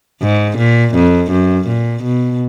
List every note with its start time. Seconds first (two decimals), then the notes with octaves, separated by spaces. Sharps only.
0.22 G#2
0.58 A#2
0.95 F2
1.31 F#2
1.68 A#2
2.04 B2